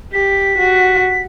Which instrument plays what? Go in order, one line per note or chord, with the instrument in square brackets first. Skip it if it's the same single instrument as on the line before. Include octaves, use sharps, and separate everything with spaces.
[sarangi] G4 [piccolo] B6
[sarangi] F#4